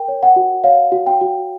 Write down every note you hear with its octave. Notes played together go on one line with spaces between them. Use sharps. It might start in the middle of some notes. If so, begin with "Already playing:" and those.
Already playing: A#4 G5
C#5
F#5
F#4
C#5 F5
F#4
G5
F#4